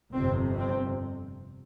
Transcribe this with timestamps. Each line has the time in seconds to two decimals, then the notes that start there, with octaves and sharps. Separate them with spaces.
0.13 G1 F2 C3 C4
0.58 C4